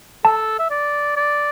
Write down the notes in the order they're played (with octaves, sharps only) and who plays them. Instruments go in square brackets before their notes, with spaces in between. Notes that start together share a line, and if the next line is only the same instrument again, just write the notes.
[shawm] A4 [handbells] A5
[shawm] E5
D5
D5